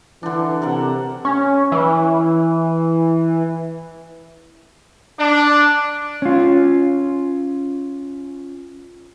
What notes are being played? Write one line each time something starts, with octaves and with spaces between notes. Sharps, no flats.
D3 E3 D4
C3 A4 A#4 F#5
C#4
E3
D4
C#4 F4